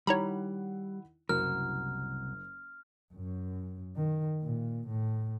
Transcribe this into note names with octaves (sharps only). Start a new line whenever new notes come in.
D#3 G3 E4 C#5 F#5 A#5 B5
F#1 C2 F#4 A#4 F6
F#2
D#3
A#2
A2